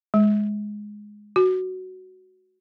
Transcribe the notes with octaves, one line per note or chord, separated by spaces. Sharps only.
G#3
F#4